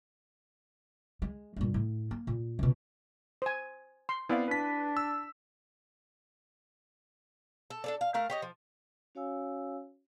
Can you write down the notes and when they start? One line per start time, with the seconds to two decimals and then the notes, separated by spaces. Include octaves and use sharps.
1.22 G#3
1.56 G2 A#2
1.74 A2
2.11 A#3
2.27 A#2
2.59 C#2 B2
3.42 C5 G#5
4.09 C6
4.29 B3 C4 E4 D5 F5
4.48 D4 B4 B6
4.97 E6
7.70 A4
7.84 D4 A4 D5
8.01 F5
8.14 A3 A#4 F5
8.30 G4 C#5 D#5
8.42 F3
9.15 C#4 F#4 C#5 F5 G#5 E6